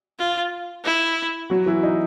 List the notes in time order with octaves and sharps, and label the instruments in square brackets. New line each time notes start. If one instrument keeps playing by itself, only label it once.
[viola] F4
E4
[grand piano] F#3 F#4
E3 E4
D#4